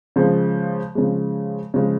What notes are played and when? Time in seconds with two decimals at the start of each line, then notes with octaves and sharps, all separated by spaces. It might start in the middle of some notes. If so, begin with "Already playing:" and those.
0.16 C#3 F3 G#3
0.95 C#3 F3 G#3
1.74 C#3 F3 G#3